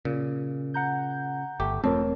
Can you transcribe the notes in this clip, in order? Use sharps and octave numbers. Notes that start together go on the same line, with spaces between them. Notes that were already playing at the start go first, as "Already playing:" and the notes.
A#2 C#3
F#5 A#5 G6
G1 A3 G4
E1 F2 A3 C4 A#4 C#5 A5